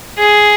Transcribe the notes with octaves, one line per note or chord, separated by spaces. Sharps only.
G#4